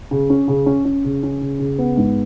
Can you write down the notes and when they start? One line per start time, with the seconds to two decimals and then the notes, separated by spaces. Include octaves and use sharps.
0.11 C#3
0.30 C#4
0.48 C#3
0.66 C#4
0.85 C#4
1.05 C#3
1.23 C#4
1.41 C#3
1.60 C#3
1.78 B3
1.97 G#2